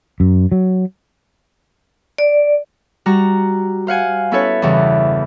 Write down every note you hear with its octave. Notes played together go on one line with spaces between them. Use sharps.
F#2
F#3
D5
G3 F#4 F#5 A#5
C5 F5 F#5 G#5
B3 C#4 E4 A4 B4 C#5
E2 G2 C#3 E3